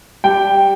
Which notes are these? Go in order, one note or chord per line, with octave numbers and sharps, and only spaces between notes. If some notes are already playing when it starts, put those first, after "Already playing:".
G3 G5